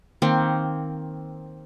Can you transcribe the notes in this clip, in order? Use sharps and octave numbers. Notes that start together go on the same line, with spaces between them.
D#3 A#3 C4